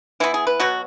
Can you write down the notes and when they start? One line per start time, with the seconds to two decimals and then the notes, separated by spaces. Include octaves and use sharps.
0.20 E3 B3 E4
0.34 G#4
0.47 B4
0.60 B2 F#3 B3 F#4